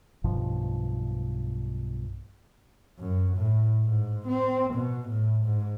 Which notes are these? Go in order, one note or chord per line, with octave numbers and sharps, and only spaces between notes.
B1 G2 B2 F3
F#2
A2
G#2
C4
B2
A2
G#2